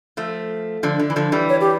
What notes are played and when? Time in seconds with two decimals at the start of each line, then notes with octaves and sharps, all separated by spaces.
0.17 F3 A3
0.83 D3 F3
0.99 D3
1.10 E3
1.16 D3 F3
1.32 E3 G3
1.49 C#5
1.61 G4